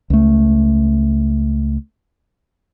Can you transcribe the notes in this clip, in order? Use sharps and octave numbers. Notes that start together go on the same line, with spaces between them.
C#2 A3